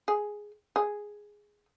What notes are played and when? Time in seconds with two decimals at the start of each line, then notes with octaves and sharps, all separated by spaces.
0.08 G#4
0.76 G#4